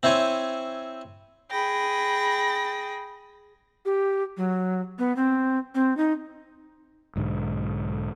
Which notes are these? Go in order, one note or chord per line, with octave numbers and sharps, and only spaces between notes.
C4 E4 C5 C#5 G#5
G#4 G5 B5 A#6
G4
F#3
B3
C4
C4
D#4
B1 G#2 D3